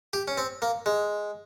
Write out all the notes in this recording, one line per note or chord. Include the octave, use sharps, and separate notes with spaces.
G4
C#4
C4
A#3
G#3